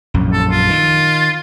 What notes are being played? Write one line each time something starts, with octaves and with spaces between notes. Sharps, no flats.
A#1 F#2
A4
F4
D#3